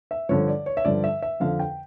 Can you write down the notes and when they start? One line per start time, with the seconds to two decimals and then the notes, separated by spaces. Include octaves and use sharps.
0.11 E5
0.29 G2 D3 F3 C#5
0.48 D5
0.66 C#5
0.77 E5
0.85 G2 D3 F3 D5
1.04 E5
1.22 E5
1.40 F2 D3 F3 F5
1.59 G5